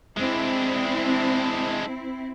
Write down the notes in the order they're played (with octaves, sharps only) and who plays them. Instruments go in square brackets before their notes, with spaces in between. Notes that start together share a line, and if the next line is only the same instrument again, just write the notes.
[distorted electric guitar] G#3 D4 [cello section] C4 E4